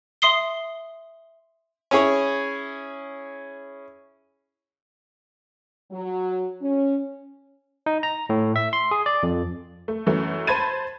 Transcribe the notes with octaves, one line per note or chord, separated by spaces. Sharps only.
E5 C6 D#6 C7 G7
C#4 E4 G#4 C#5
F#3
C#4
D#4
A#5
A2
E5
C6
G#4
D5
F2
A3
F#2 E3 A3
C5 A5 B5 G#6 A6 D#7